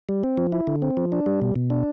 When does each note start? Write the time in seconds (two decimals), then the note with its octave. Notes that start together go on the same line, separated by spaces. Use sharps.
0.09 G3
0.23 C4
0.37 F3
0.52 E4
0.67 D3
0.82 C4
0.97 F3
1.12 D4
1.26 G3
1.42 B2
1.56 B2
1.70 D4